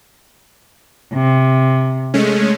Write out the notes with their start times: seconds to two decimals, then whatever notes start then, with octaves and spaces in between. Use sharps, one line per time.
1.14 C3
2.14 G#3 A3 C#4